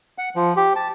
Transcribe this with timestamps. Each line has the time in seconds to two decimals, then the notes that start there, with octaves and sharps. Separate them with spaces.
0.18 F#5
0.36 F3
0.57 G4
0.76 A5